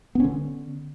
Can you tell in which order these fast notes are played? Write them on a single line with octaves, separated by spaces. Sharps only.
B3 C#4 D3